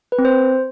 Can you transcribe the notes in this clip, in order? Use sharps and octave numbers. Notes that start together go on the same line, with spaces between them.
B4
C4
C5